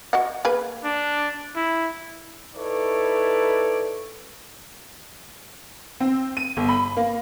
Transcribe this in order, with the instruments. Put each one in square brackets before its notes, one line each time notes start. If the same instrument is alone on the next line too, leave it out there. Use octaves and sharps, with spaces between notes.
[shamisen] F#4 D#5 F#5
A#3 G#4 B4
[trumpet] D4
E4
[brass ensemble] D#4 E4 A4 B4 C#5 D5
[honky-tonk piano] C4
D#7
G1
B5
A#3